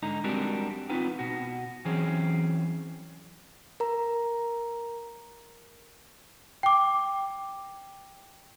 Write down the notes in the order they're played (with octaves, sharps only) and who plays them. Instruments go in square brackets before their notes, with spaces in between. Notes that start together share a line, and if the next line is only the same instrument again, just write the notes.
[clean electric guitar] G#2 D3 D#4 A#5
G3 G#3 C4 D4 F#4 A#4
B3 C4 D#4 F4 B4
B2 F#4
E3 F#3 C4 C#4 G#4
[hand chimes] A#4 A#5
[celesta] G5 D6